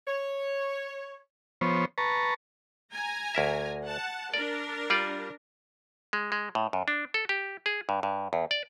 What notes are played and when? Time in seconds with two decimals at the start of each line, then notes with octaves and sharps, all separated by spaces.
0.06 C#5
1.61 F3 B3 C5 C#5
1.98 B4 A5 A#5 C#6
2.92 G#5 A#5
3.35 D2 A#4 E5
3.86 F#5 A5
4.34 D4 A#4 D5
4.90 G3 F4 D5
6.13 G#3
6.32 G#3
6.55 A2
6.73 F#2
6.88 D4
7.14 A4
7.29 G4
7.66 G#4
7.89 G2
8.03 G2
8.33 E2
8.51 D5